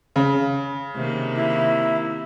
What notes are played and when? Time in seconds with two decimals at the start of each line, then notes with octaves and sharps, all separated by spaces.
0.16 C#3
0.95 C3 D#3 A#3
1.37 E4